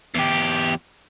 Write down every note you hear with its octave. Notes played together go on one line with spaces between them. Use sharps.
E2 G4